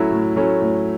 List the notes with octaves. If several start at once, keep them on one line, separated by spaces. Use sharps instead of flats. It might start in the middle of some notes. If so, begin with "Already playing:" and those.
Already playing: A2 F#3 A3 C#4 E4
A2
F#3 A3 C#4 E4
A2